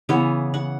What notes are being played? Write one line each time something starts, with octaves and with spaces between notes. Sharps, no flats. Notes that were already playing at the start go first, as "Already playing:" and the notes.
C#3 E3 B3 C#5
F#5